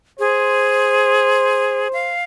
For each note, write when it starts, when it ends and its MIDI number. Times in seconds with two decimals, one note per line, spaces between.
0.19 1.88 68
0.19 2.15 72
1.93 2.24 77